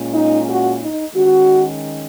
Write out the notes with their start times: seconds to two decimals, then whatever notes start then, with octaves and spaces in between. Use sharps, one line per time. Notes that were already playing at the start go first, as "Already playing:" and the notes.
Already playing: A#2 G#3 C#4
0.14 D#4
0.47 F#4
0.82 D#4
1.15 D#3 G#3 C#4 F#4